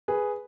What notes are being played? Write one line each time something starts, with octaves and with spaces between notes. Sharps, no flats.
G#4 B4